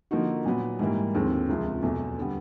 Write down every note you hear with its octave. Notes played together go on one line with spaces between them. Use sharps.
D3 F3 A#3 D#4 F#4
A#2 F#3 B3
G#2 E3 G3 A#3
D#2 D3 F3 G#3 C4
C#2 C3 F3
E2 B2 F#3 A3
D3 G3 B3